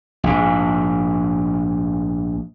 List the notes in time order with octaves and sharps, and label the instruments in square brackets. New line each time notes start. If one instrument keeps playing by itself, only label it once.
[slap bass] A#1 G#2